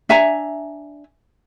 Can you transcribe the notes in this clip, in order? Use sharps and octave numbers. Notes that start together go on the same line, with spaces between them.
D4 E5 G#5 A#5